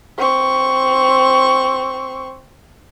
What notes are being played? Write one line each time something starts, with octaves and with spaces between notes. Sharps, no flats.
C4 C#6